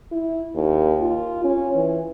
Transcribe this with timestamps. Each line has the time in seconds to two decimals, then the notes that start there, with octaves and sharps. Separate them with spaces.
0.12 E4
0.55 D#2
1.00 F4
1.44 C#4
1.75 E3